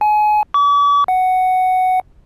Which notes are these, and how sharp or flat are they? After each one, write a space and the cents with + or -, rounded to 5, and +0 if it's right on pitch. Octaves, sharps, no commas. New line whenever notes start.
G#5 +30
D6 -45
F#5 +5